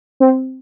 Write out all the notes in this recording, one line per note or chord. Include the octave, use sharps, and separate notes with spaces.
C4